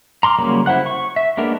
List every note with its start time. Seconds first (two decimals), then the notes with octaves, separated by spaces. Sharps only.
0.23 A#5 C6 D6 F6
0.39 C#3 F#3 G3 A#3
0.66 C#3 E4 C5 F#5 F#6
0.86 C#6
1.16 E5
1.37 G#3 A#3 B3 D4 A#4